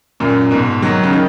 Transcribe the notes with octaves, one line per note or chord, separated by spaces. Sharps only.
F#2 A#2
G#2 B2
D#3 F#3
C#3
D#3